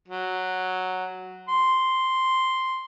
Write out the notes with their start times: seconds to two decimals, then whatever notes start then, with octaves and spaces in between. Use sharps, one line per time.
0.08 F#3
1.49 C6